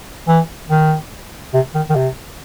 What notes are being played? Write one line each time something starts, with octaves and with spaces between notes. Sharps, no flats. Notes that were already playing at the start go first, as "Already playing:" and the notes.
E3
D#3
C3
D#3
D#3
C3